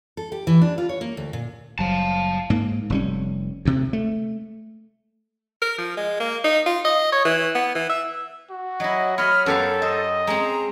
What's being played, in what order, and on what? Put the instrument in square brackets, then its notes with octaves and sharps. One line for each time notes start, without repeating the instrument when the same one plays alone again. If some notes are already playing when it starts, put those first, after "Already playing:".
[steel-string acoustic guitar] A4
G4
E3
D4
F4
C#5
A#3
D2
A#2
[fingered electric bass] F#1 F#3 G3 [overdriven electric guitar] F5 A5
[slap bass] G#2 A#3
F1 G3 C#4
D2 C3
A3
[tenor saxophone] A#4
F3
G#3
A#3
D#4
F4
D#5
C#5
E3
B3
E3
E5
[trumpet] F#4
[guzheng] F#3 E4 [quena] D#5
[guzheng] C#5 D#5 [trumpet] B5 [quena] F6
[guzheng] F#2 G4 F5 [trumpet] B3 [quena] A4
[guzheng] C5 [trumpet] D#5
[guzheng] G#3 C4 [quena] A#5